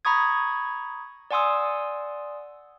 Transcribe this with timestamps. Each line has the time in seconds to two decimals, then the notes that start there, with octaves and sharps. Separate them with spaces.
0.05 A#5 B5 C#6 D#6 G#6
1.31 D5 F#5 G#5 C6 D#6 E6